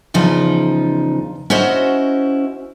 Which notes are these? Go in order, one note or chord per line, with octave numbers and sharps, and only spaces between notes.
E2 C#3 F3 D#4
C#4 E4 F#4 C5 D#5